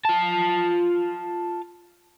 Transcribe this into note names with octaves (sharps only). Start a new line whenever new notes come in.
F4 A5